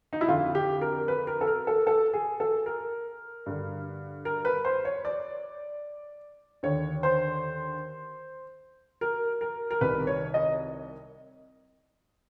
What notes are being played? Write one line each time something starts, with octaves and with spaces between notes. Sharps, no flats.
D#4
E4
F2 D3 F4
G4
A#4
B4
A#4
A4
A#4
A4
A4
G#4
A4
A#4
G2 D3
A#4
B4
C5
C#5
D5
D#2 D3 C#5
C5
A#4
A#4
A#4
C2 C3 D#3 B4
C#5
D#5